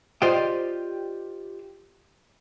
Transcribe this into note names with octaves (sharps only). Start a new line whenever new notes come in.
F4 G4 C5 D5 D#5 G5